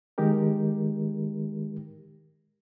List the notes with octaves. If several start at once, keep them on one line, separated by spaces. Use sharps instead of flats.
D#3 G#3 D#4 G4 A#4